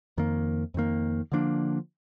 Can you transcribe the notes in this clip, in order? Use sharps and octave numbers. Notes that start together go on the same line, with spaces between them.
F2 D#3 A#3
F2 D#3 A#3
D3 F3 A#3 D4